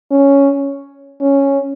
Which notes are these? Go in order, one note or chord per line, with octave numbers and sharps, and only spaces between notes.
C#4
C#4